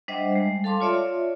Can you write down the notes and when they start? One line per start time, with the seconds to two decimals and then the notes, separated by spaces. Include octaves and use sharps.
0.08 G3 D4 C5 D#5 E5 F#5
0.32 G3 G#3
0.64 A4 F5 A5 C6 D6
0.81 F4 C#5 D5 E5